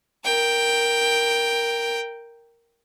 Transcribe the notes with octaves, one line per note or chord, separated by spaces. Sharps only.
A#4 G5